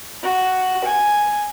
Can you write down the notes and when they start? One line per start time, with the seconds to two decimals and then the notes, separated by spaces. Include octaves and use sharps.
0.23 F#4
0.85 G#5